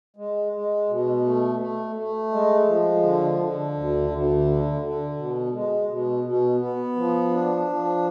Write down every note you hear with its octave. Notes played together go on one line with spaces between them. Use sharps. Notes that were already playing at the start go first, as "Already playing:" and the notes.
G#3
G#3
B2
A3
A3
A3
G#3
F3
D3
D3
D2
D2
D3
D3
B2
G#3
B2
B2
B3
F3
D4
F3